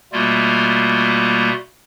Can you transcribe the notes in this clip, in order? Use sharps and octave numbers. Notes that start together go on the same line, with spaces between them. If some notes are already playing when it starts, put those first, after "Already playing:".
B2 G3 A3 A#3 F4